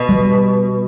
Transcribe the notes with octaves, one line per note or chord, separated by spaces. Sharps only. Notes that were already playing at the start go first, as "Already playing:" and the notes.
Already playing: B2
G3